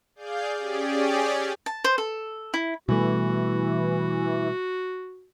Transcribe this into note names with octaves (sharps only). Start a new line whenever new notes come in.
G#4 D5 F5 G6
C#4 G4 G#4 D5
A5
C5
A4
E4
B2 E3 G3 A3 F#4